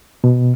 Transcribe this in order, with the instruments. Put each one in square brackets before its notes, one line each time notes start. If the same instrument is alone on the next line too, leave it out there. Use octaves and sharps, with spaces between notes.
[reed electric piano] B2